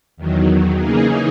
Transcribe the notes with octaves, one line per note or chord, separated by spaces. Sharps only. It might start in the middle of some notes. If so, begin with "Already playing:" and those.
E2 D#3 F#3
C#3 E3 A#3 D#4 G#4